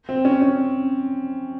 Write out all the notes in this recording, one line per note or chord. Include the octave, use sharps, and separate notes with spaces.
C4
C#4
C#4